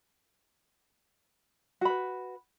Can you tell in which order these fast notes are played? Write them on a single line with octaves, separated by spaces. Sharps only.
F#4 B5 B4